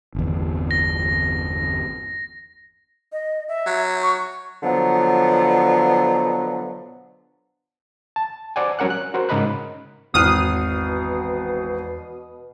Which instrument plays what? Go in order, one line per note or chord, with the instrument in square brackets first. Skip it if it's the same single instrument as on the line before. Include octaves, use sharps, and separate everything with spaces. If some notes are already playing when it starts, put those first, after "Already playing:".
[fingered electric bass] G1 E2
[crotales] A#6
[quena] D#5
E5
[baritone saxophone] F#3
[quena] C#6
[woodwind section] B2 D3 F3 F#3 B3
[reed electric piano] A5
C5 D5 F#5 G#5
F#3 G3 C#4 A#4 F#5 F#6
F#6
F#4 A#4 C5
G#2 C#3 A#4 D#5 B5 F#6
[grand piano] G#1 F6 F#6 [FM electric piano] E2 E3 C7 [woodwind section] B2 [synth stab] D#6